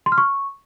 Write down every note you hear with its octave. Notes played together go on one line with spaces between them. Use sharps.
C6
F6
C#6